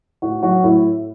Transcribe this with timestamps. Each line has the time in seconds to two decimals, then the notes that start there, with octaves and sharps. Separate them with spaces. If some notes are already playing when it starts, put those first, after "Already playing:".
0.22 A2 F#4
0.43 F#3 F#4
0.63 A2 E4